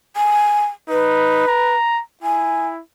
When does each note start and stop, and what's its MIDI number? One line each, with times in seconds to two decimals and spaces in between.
0.16 0.65 80
0.89 1.46 63
0.89 1.75 71
1.47 2.02 82
2.23 2.82 64
2.23 2.68 80